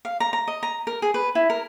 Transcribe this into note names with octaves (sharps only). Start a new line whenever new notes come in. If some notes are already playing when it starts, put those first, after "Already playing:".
F5
A#5
A#5
D#5
A#5
A#4
G#4
B4
E4
A#4